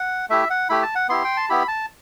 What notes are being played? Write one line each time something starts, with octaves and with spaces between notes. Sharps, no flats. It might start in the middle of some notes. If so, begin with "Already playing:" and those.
Already playing: F#5
A3 E4 G4 E5
F#5
A3 E4 G4 B5
A5
F#5
B3 E4 G4 C6
G5
A5
B3 E4 G4 B5
A5